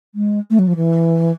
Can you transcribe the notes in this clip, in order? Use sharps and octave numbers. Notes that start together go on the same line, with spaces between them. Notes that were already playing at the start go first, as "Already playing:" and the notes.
G#3
A3
F#3
F3
E3